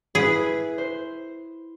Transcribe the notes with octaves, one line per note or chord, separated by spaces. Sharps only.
E4 G#4 B4
C5